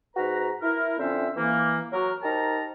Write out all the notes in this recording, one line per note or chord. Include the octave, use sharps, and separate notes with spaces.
G#2 F#4 B4 A#5
E4 A#4
F2 D3 C4 C#4 C5 E5
E3 A#3
F#3 F#4 A#4
D#4 G4 A#4 C5 A5 A#5